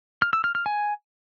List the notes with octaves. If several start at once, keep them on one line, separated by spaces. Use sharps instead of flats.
F6
E6
F6
F6
G#5